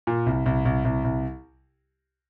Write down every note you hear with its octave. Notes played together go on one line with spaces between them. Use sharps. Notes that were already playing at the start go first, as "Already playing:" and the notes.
A#2
C2
C2
C2
C2
C2